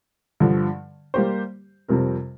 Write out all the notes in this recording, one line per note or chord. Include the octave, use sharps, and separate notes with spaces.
G2 D3 F3
G3 A#3 G4 C5
F2 C3 G3 C4 A#4